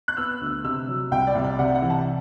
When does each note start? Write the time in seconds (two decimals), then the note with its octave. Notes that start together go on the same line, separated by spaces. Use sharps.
0.08 F#6
0.17 B3 E6
0.41 D2
0.64 C3 E6
0.88 F#3
1.11 C2 G5
1.27 D5
1.35 C2
1.44 D5
1.59 C3 F#5
1.75 F#5
1.82 E3
1.90 A5